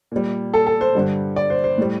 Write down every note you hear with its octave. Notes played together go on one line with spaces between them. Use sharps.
A#2 G3
A4
A4
C5
G2 D3 G3
D5
C5
C5
A2 G3